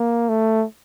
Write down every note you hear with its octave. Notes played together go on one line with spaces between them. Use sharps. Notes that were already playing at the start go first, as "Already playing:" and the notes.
Already playing: A#3
A3